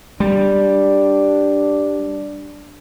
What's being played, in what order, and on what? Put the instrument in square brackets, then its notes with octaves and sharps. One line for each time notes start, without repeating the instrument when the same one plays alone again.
[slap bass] G3 [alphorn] D4